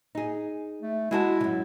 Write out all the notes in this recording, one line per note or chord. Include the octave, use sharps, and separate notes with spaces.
D#4 G#4
A3
G#3 E4 F#4 A5
F#2 D#3